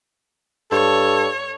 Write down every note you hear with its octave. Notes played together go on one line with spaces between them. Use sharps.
G2 A4 C#5